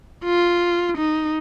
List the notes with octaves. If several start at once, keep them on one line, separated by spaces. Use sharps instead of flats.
F4
D#4